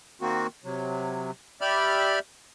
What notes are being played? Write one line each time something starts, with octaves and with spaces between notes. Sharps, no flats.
D#3 A#3 C4 F#4
C3 F#3
G4 D5 E5 B5 F6